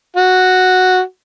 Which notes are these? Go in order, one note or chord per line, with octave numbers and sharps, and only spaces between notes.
F#4